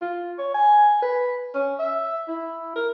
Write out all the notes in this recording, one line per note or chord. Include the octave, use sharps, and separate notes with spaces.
F4
C#5
G#5
B4
C#4
E5
E4
A#4